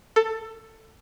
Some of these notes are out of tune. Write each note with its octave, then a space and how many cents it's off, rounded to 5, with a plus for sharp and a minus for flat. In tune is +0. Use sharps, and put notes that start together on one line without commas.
A4 +15